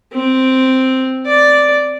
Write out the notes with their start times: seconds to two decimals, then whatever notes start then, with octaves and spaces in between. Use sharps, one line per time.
0.13 C4
1.26 D5